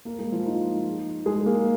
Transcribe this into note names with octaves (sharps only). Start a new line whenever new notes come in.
A#3 A#4
G#3 G#4
F3 F4
D#4
G#3 G#4
A#3 A#4